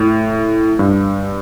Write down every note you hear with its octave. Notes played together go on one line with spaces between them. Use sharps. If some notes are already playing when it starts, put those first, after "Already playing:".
Already playing: A2
G2